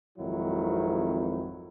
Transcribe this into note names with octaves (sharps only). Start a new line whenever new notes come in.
G#1 F2 D#3 F#3 E4